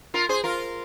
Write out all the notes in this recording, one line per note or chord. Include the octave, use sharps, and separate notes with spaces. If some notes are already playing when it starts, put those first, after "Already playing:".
F4 A#4
G#4 C5
F4 A#4